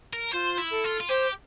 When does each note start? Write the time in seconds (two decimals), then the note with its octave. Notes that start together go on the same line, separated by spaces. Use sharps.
0.13 A#4
0.32 F4 C5
0.58 E4
0.71 A4
0.84 F4
1.00 F4
1.09 G4 C5